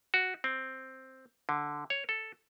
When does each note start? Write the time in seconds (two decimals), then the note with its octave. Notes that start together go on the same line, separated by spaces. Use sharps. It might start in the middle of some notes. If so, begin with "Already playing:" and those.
0.14 F#4
0.44 C4
1.49 D3
1.90 C#5
2.09 A4